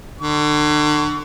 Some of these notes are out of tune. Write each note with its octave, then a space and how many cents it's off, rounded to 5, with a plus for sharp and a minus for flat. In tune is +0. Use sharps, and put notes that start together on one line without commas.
D3 +35 C#6 +35